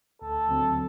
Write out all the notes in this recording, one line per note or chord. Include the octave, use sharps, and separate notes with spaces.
D2 A4
D3 F#3 C4